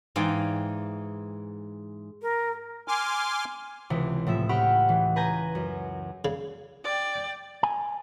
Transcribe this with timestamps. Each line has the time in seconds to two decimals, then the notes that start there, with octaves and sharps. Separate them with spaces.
0.16 G#2 E3 D5 F5 G5
2.22 A#4
2.88 G#5 C6 D6 F6
3.90 C#2 C3 E3
4.27 A2 F3 E5
4.49 G4 F#5 G5 B5 C#6 F6
4.89 E3
5.16 B4 G#5 A#5 G6 A#6
5.55 F#2
6.25 C#3
6.84 D5 G5
7.63 G#5